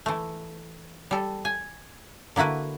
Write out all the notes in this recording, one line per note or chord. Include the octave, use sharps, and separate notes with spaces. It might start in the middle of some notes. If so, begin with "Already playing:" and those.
E3 A3
G3 A4
G#5
D3 A#3 E4 F#4 B4